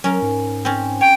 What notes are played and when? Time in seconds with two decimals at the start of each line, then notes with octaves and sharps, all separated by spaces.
0.04 F#3 C#4 A#4
0.22 G#2
0.65 C4 C#4
1.01 C#5 G5